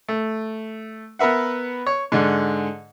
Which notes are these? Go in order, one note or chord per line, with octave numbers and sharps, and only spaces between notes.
A3
B3 A#4 B4 E5 F#5
C#5
G#2 D3